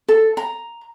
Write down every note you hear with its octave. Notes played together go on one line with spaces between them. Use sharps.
A4
A#5